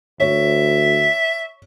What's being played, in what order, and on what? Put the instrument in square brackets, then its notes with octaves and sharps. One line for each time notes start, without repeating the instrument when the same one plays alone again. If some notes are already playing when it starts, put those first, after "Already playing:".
[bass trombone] D2 [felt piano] C#5 [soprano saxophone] E5